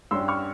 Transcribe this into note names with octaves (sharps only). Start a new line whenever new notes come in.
G2 G3 C#4 C6 E6
C#6 F6